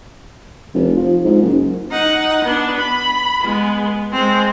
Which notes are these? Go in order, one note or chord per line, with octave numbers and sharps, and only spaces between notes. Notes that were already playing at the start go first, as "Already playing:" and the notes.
F1
F3
G#2
F#1
D#4 F#5
B3 D4
B5
G#3 B3
G#3 C4